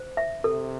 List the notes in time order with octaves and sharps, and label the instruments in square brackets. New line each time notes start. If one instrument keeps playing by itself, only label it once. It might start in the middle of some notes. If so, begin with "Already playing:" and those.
Already playing: [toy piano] C5
E5
[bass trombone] C3 [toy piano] A4